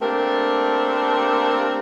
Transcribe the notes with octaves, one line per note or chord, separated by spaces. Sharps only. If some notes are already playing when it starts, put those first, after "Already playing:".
A3 A#3 C4 D4 G4 A#4